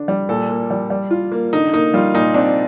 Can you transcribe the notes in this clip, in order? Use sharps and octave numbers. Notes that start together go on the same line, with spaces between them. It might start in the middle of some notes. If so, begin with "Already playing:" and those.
Already playing: D3 D4
G3
A#2 A4
A#3
G3
G3
F4
A#3
D3 D#4
A#3 D#4
G3 F4
A#2 D#4
C4 D4